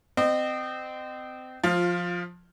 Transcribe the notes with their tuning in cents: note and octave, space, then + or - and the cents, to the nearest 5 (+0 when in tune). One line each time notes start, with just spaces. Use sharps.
C4 -25 D#5 -30
F3 +15 F4 +0